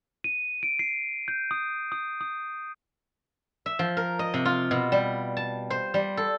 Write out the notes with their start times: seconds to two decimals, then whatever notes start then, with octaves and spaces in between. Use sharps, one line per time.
0.24 D#7
0.63 D7
0.79 C7
1.28 G6
1.51 D#6
1.92 D#6
2.21 D#6
3.66 E5
3.79 F3
3.97 A#4
4.19 D#5
4.34 C3
4.45 F4
4.71 B2
4.92 G3
5.37 A5
5.70 C5
5.94 G3
6.17 A4